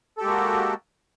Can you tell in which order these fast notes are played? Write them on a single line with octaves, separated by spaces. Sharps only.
A4 G4 G#3 A#3 F#4